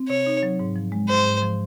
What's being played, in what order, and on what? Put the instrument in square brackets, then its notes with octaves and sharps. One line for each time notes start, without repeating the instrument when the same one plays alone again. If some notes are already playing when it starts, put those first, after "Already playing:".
Already playing: [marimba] C4
[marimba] C3 [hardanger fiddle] C#5
[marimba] D#4
F#3
G#2
F3
G#3
[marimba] G#2 [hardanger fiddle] C5
[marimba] G#2
F3